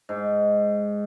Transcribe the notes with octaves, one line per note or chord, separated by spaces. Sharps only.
G#2